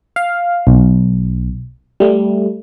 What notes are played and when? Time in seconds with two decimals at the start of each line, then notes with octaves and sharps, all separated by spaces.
0.16 F5
0.67 B1
2.00 G3 A3